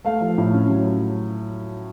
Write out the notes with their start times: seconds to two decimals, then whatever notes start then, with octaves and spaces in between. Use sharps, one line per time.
0.05 A3 F5
0.21 F3
0.38 A2
0.54 C#4
0.69 F#3